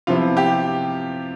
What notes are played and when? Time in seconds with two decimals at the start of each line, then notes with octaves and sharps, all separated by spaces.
0.07 C3 F3 B3 E4 F4
0.37 G4